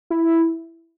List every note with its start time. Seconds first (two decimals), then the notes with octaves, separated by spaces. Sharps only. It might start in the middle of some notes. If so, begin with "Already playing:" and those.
0.10 E4